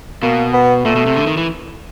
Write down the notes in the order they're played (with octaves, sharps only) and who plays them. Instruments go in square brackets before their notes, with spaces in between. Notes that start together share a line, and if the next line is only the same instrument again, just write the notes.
[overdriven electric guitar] B2 [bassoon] A#3
[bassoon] B3
[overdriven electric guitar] A#2 [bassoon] A3
[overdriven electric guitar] B2
C3
D3
D#3
E3